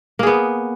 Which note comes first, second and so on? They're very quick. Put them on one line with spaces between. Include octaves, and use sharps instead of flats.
A#3 G#4 B3